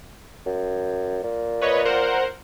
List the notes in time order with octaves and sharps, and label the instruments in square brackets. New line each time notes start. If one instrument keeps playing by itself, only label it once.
[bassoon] F#2
A#2
[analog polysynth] B4 C#5 D#5
A#4 C5 F#5